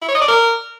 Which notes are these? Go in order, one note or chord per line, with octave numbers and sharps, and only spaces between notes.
E4
C#5
D#5
D5
A#4